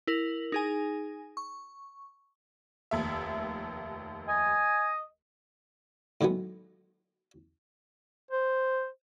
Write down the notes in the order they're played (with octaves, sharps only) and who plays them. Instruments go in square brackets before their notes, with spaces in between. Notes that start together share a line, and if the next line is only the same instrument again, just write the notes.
[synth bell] E4 A#4 F#7
D#4 G#4 G#5
C#6
[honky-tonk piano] F1 D#2 E5
[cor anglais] D#5 [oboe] G#5
[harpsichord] A2 D#3 F#3 G#3 B3
[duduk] C5